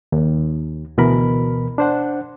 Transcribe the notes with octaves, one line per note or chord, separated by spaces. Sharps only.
D#2
D2 B2 E3 A#4 B5
D4 C5 F#5